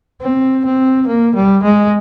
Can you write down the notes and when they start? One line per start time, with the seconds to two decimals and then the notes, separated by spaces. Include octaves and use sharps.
0.21 C4
0.65 C4
1.07 A#3
1.35 G3
1.63 G#3